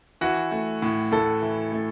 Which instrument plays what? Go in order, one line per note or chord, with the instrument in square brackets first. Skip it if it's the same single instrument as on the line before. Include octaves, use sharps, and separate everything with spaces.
[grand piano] E3 F#4
A3
A2
A2 A4
E3
A3